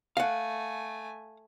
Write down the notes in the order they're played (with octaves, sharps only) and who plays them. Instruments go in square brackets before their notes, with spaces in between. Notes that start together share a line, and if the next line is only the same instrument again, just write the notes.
[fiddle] A3 G#5 [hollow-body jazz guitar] F5 F#5